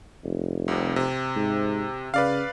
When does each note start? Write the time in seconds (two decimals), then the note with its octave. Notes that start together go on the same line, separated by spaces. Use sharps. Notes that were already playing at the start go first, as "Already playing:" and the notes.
0.24 F1
0.68 C2 C3
0.96 C3
1.36 G#2
2.14 C#3 B4 D5 F5